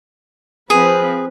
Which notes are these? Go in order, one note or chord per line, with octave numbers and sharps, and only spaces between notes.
F3 C4 G#4 B4